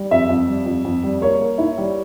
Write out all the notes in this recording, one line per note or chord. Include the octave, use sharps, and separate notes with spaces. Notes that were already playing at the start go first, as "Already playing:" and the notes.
Already playing: G3
F2 E5
F2
G3
F2
F2
G3
A#3 C#5
A#3
E4
G3